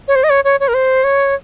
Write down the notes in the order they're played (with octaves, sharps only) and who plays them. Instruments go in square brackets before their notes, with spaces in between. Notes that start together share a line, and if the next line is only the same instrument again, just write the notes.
[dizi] C#5
C5
D#5
C#5
C#5
C#5
A#4
C5
C#5